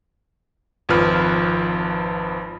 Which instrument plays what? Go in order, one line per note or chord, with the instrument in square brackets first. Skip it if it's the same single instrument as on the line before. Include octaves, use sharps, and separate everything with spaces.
[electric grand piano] G#1 F2 F3 B4 F6